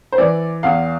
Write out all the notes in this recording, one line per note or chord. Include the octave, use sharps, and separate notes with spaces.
C5
E3 D5
E2 F5